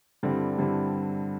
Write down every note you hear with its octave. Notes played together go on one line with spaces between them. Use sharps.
G2 D3 G3 C4 E4
G2 D3 G3 C4 E4